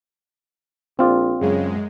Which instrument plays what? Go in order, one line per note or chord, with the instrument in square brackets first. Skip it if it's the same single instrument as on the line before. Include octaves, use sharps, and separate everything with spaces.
[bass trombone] A#1 [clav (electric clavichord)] C4 F4 D5
[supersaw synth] F#2 G#3 [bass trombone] C#3